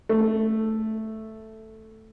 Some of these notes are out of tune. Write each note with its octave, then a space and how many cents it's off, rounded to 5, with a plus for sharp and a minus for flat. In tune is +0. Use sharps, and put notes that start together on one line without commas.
A3 +0